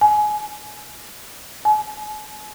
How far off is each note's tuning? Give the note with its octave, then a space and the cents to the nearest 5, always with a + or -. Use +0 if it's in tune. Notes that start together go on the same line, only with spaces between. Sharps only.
G#5 +20
G#5 +40